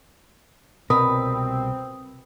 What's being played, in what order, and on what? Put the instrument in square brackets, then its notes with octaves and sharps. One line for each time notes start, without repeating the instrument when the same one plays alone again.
[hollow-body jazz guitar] C2 B2 A#4 [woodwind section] C4 [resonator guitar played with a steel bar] B4 [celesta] D#6